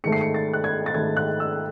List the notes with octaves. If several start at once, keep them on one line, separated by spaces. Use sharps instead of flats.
G#2 D#3 A3 C#7
C7
C#7
A6
F#6
G#6
A6
G#2 D#3 A3 G#6
F#6
E6